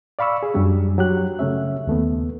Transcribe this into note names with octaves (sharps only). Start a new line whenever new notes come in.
D5 F5 B5 C#6 E6
G#4
F#2 F#3 G3 D4
F#3 G4 F#6
C#3 A3 C#4 E5
D#2 A3 B3